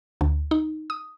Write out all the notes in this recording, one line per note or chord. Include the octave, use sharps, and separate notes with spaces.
D2
D#4
D#6